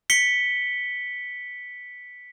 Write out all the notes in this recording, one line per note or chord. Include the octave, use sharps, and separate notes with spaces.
B6 C#7 G7